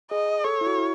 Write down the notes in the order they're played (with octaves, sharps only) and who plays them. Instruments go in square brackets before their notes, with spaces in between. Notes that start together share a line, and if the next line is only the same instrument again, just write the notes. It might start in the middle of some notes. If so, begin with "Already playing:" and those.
[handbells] G#4 [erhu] D#5
[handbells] A4 [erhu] C#5
[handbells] E4
F#4
E4